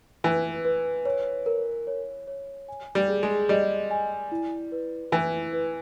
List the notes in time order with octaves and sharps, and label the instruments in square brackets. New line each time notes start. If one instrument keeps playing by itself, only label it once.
[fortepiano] E3 [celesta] B4
[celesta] B4
C#5
A#4
C#5
C#5
G#5
[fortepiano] G3
[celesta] G#4
[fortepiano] G#3
[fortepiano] G3 [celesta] D#5
[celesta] G#5
E4
B4
[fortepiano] E3 [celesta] E4
[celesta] B4